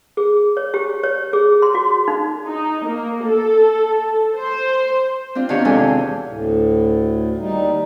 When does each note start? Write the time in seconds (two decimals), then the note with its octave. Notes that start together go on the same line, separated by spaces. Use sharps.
0.17 G#4
0.57 C#5
0.74 G4
1.03 C#5
1.33 G#4
1.62 C6
1.75 F#4
2.08 D#4
2.46 D#4
2.86 A#3
3.25 A4
4.37 C5
5.35 C4 D4 F4
5.49 B2 D#3 D4 G4 C#5 F5
5.65 E2 C3 G#3 F4 A4 G#5
6.28 D2 A2
7.38 D#2 G3 D#4